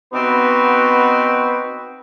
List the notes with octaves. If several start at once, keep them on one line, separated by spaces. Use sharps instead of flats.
B3 C4 D#4 F#4 B4